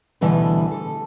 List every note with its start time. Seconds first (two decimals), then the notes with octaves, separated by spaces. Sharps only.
0.21 D2 B2 D3 E3 G3 B4
0.71 A4